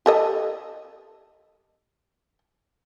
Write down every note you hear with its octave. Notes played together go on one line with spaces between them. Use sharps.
G4 A4 D#5